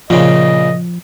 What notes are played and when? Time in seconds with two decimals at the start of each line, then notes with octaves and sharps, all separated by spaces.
0.10 A#2 C#3 F3 D#5